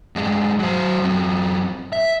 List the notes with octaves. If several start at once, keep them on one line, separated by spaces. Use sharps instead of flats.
G2 G#3
F#3 C5
F#2 C4
E5